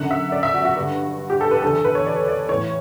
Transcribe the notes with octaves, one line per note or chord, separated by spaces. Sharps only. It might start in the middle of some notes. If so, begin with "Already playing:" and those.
Already playing: F#2 D3 F#5
E5
D5
E5
F#4
F#4
G2 D3
G4
A4
B4
E2 D3 A4
A4
B4
C#5
D5
D5
A2 E3 C#5